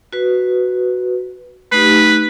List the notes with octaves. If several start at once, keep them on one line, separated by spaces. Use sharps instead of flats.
F#4 B4
A3 D#4 G4 B4